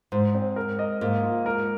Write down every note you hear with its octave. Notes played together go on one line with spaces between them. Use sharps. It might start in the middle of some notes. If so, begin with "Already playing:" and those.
G#2 C5
C4
A#4
D#5
G#2 A#3
F4
A#4